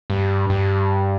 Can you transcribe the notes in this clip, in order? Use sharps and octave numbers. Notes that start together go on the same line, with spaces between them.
G2
G2